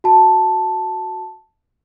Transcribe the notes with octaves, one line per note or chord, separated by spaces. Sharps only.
F#4 A5